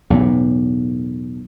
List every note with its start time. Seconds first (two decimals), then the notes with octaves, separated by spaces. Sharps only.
0.10 B1 E2 A2